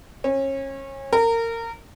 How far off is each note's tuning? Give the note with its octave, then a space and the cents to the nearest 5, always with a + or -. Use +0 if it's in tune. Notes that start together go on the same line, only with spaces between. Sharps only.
C#4 -30
A#4 -25